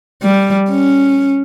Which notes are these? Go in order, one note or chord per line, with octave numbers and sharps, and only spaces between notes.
G3
C#4